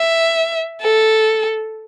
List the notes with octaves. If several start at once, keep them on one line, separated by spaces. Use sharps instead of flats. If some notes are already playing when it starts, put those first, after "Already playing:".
Already playing: E5
A4